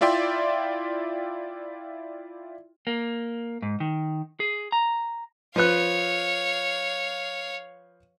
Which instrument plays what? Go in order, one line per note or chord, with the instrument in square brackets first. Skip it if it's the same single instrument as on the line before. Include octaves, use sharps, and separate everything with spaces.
[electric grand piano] E4 F4 D5 E5 G5 C6
[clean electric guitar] A#3
G#2
D#3
G#4
A#5
[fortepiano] F3 B4 F#6 [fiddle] C#5 F5